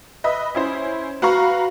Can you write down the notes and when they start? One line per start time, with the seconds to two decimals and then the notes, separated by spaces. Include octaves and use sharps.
0.24 B4 D#5 E5
0.55 C#4 E4 C5
1.22 F#4 B4 F5 A#5 C#6